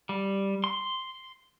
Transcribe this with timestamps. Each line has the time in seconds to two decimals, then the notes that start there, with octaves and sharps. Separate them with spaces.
0.09 G3
0.64 C6